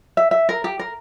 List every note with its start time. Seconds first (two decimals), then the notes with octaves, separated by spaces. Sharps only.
0.17 E5
0.31 E5
0.49 A#4
0.64 G4
0.79 A#4